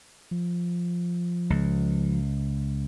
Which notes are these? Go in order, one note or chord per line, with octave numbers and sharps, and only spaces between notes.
F3
C#2